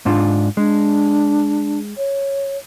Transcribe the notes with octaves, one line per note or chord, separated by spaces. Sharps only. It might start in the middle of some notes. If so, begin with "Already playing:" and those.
G#2 D4 F4
G#3 D4
C#5